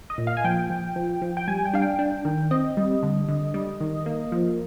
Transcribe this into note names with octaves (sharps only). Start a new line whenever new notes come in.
D#5
A#2
F5
G#5
F3 G5
F3
F3
F3
G5
G3 G#5
G5
D4 F5
G5
D4
D#3
C4 D#5
G3
D3
D3
G3
D#3
A#3
F3